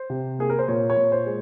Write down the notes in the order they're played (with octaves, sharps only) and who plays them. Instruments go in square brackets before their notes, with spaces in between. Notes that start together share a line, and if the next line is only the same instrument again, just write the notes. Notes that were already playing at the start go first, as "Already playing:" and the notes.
Already playing: [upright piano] C5
C3
A#3 G#4
A#4
C5
A#2 C#5
C#5
A#2
C5
G#3